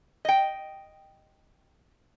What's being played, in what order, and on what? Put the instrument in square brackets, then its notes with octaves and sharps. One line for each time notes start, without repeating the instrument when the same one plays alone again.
[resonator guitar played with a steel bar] D#5 G5